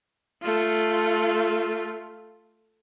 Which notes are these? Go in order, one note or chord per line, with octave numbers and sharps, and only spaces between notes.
A3 F4